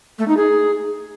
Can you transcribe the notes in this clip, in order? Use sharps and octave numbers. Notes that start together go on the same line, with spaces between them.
A3
D#4
G#4